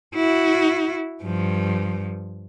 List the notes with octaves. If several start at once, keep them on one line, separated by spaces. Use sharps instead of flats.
E4 F#4
G2 F3